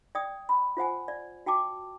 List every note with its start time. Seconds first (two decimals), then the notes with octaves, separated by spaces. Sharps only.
0.15 D5 G5 D#6
0.49 B5
0.77 F4 C5 F#5 G#5
1.08 D5
1.46 F#4 G5 A5 D6